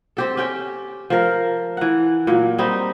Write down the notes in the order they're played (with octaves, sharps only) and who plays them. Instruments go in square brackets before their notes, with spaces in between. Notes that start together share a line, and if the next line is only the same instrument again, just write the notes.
[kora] C4 G4 A4
C#4 G4 G5
F3 A#4
E3 F#5
A#2 F#3
G3 C4 D#4